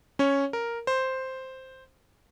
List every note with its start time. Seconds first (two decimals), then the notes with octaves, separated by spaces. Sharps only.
0.19 C#4 C#5
0.53 A#4
0.87 C5